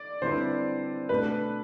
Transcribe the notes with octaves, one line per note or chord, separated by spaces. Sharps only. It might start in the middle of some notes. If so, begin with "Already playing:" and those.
Already playing: D5
D3 G3 C4 E4 B4 C5
B2 A3 D4 B4